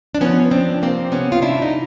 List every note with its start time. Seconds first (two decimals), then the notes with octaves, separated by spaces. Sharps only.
0.15 D4
0.21 F3 B3 C#4
0.51 F3 C4 D4
0.82 C3 A#3 C4
1.12 C3 B3 C#4
1.32 F4
1.42 C3 D4 E4
1.62 D#4